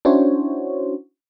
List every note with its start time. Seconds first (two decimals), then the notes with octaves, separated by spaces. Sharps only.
0.05 C#4 D4 E4 F#4 C5 C#5